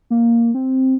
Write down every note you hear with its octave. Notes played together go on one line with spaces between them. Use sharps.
A#3
C4